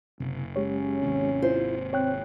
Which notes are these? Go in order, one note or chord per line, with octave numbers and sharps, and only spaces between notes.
F#1 C3
G#3 C#4 G4 C#5
G#1 D#2 C3
E4 F4 C5
C4 C#5 G5 F#6